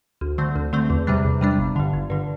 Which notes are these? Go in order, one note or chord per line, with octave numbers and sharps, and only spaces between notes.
D2
D3 A3 C4
D2
D3 A3 C4
E2
C3 G3 D4
E2
C3 G3 D4
G1
G2 D3
G1
G2 D3